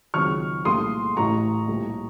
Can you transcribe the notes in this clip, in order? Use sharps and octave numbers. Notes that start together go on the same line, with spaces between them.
C#2 C3 D#3 F#3 C#6 F6
C2 A#2 A3 C6 D#6
A1 A2 A3 A#5 C#6
C2 A#2 A3